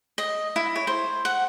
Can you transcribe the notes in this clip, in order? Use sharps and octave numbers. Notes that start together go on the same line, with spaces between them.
D#5
E4
C#5
C5
F#5